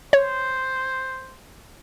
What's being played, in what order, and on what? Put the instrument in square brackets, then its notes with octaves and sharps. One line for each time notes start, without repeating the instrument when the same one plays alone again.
[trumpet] C5 [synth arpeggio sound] C#5